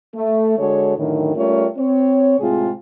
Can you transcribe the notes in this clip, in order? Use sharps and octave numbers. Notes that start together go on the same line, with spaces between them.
A3
D3 G#3 F#4 A4 C#5
F#2 A2 D3 D#3
G3 A3 C#4 F4 A#4 C#5
C4 C#5
A2 C3 G#3 C4 F4 G#4